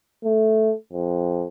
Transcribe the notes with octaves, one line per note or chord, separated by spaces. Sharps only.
A3
F2